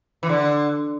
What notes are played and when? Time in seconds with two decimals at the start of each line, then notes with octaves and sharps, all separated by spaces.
0.23 E3
0.29 D3